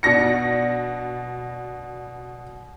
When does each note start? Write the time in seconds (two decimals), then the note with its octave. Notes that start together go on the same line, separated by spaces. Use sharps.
0.03 B2 D4 A#6 C#7